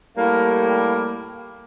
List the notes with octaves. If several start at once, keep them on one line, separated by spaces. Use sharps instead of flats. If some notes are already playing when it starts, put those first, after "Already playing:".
A2 G3 A#3